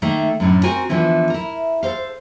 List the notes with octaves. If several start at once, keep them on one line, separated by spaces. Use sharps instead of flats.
D#3 A3 A#3
F#2 A2 D3
C4 F#4 A#4 G#5
D3 E3 F3 B3 C#4 E4
E4 A#4
A4 A#4 C5 F5